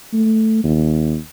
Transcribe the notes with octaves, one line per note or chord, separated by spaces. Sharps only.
A3
D#2